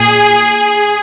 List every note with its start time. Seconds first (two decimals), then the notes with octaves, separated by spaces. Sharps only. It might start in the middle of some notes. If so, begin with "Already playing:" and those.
Already playing: A#2 G#4